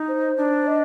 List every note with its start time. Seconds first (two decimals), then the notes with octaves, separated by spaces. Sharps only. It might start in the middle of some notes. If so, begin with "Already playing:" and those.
Already playing: D#4
0.08 C5
0.37 D4
0.67 D#5